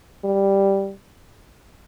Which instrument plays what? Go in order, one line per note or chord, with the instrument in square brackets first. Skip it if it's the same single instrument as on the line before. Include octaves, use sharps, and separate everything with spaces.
[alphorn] G3